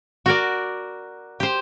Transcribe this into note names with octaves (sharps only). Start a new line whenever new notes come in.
F#4 A#4 D5
G4 C5